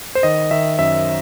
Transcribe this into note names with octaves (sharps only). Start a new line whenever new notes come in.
C5
D#3 D#5
D#3 E5
F#2 E5